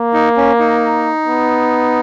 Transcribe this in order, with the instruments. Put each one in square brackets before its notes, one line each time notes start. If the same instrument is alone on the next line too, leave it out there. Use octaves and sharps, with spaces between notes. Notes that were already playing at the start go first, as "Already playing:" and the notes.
Already playing: [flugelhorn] A#3
[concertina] D#4
C#4
D#4
[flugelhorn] B3